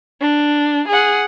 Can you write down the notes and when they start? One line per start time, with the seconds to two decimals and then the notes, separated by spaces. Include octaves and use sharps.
0.21 D4
0.88 G#4 F#5